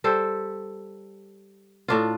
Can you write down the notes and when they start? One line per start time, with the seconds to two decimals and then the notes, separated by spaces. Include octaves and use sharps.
0.04 G3 A4 C5
1.88 A2 D4 F4